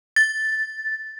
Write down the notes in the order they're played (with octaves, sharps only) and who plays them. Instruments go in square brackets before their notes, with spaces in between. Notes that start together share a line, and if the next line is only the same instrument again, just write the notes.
[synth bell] A6